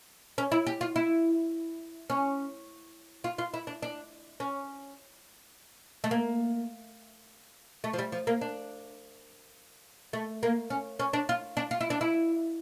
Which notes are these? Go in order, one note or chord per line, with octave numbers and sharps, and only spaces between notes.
C#4
E4
G4
F4
E4
C#4
F4
F4
E4
D4
D4
C#4
A3
A#3
A3
F3
G3
F3
A#3
D4
A3
A#3
C#4
C#4
D4
F4
D4
F4
E4
D4
E4